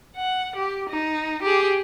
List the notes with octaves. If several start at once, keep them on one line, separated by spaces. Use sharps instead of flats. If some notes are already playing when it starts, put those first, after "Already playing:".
F#5
G4
D#4
G4 G#4